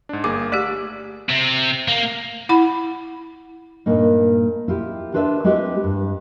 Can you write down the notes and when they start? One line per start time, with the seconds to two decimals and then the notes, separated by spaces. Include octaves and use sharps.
0.09 G#2 D4
0.24 G1 A#3 G#4 D6
0.52 A3 G4 D5 B6
1.29 C3
1.88 A#3
2.49 E4 F#5 B5
3.86 G2 A#2 A#3 D#4
4.68 E4 F4 G4
5.14 D4 F4 B4 D5 E5
5.44 G#3 C4 E4 G4 B4 E5
5.84 G2